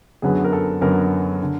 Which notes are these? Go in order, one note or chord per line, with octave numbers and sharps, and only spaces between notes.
F#2 D3 F#3 B3 G#4
A#4
A4
F#2 D3 F#3 B3 A#4
D3